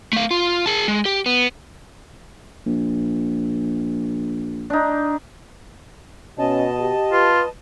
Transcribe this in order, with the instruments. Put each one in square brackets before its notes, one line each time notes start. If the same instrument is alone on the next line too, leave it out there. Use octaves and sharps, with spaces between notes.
[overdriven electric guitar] A3 F5
F4
G#4 A5
G#3
G4
B3
[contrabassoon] A#1
[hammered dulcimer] D4 D#4
[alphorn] B2 [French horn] C#4 [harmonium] D#5 A5
[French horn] G4
[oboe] F4 [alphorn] B4